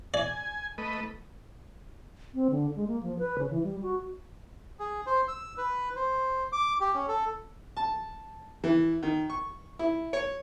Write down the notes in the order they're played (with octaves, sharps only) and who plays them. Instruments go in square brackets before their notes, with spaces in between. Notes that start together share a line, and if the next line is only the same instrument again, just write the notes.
[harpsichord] D5 [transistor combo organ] G#5
[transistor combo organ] A3 B4 D#5
[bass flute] C4
D3
G#3
A#3
F3
B4
C#3
E3
G3
F#4
[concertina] G#4
C5
E6
B4
C5
D6
G4
C#4
A4
[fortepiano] A5
E3
D#3
C#6
E4
C#5